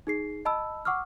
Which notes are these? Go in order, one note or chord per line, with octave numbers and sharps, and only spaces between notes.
D#4 G#4 C7
D#5 A5 B5 E6
F#5 C#6 D6 E6 F6